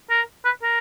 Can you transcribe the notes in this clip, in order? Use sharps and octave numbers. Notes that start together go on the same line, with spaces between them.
A#4
B4
A#4